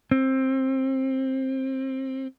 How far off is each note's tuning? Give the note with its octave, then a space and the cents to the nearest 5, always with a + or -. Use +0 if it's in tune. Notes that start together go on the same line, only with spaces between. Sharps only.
C4 +20